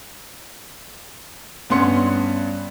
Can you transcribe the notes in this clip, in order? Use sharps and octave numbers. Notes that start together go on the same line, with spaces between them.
G2 B3 C#4 C6 C#7